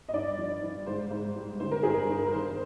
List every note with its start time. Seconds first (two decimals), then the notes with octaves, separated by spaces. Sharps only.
0.09 D#5
0.13 G2 D5
0.38 F3
0.62 G2
0.87 G#2 C5
1.11 G#2
1.35 G3
1.60 D3 C5
1.71 A#4
1.83 G2 G#4
1.94 A#4
2.09 G2
2.27 A#4
2.33 D#3 C5